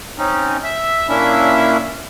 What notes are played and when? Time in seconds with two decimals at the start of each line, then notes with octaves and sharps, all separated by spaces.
0.18 C4 C#4 D#4
0.64 E5
1.09 A#2 A#3 C#4 D4 E4 E5